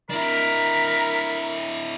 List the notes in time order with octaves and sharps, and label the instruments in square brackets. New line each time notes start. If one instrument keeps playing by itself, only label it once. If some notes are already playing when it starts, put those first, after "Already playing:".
[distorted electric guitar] D4 E4 [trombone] A#4 [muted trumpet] B5